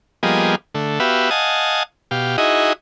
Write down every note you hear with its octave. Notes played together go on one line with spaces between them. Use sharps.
F3 G3 A#3 B3 G#4 D#5
D3 A3
B3 F#4 G4 B4 E5 F5
D#5 F5 F#5 G#5 A5 D#6
B2 G4 F5
D#4 E4 F#4 G#4 D#5